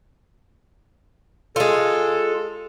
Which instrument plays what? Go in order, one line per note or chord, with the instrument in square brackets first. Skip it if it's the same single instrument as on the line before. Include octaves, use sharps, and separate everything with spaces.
[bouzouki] G#3 F4 [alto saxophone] A4